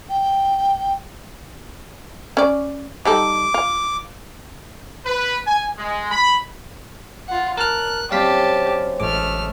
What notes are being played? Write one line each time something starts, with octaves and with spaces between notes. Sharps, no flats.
G5
C#4 D5
G3 D#4 A4 D6
F4
B4
G#5
G#3
B5
F4 F#5
A#4 A5 F6 F#6
F#2 C4 G4 D5 F5 A5 B6
A1 G#3 A3 D6 F6